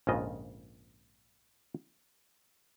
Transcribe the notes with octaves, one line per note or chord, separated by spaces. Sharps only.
A#1 F2 G#2 C#3 F4 D#5